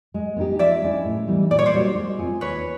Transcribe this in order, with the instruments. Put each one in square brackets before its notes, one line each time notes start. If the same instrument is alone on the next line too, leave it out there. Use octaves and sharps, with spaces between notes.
[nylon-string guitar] G#3
B3 D#4 G4
[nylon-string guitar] F3 [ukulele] D5 E5
[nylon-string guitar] G#3 C#4 E4
A2
E3 G3 B3 D#4
[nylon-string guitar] A#2 [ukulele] D5
[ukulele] C#5
C5 D5
[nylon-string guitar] G3 A#3 D#4 F#4
G#3
C4 F4 G#4
[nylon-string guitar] D#2 [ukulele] B4 C#5